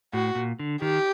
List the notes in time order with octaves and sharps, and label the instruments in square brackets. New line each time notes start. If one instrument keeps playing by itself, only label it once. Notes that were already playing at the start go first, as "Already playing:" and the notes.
[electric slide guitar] A2 [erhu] F#4
[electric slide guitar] A#2
D3
[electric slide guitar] D#3 [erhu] G4